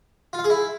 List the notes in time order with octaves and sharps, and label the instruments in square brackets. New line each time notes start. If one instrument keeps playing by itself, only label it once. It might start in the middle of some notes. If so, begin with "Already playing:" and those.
[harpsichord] F4
F5
G#4
E4